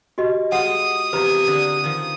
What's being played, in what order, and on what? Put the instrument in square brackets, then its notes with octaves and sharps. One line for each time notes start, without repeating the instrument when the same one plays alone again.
[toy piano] F#4 G4 D#5
[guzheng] G#3 F4 G5 [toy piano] F#5 [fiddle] D#6
[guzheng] E2 C3 F3 [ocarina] G4 [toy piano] B4 A#5
[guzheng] D3 G#4
D#3 F3